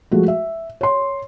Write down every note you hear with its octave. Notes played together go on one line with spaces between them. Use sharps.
F3 G#3 A3 F#4
E5
C#5 C6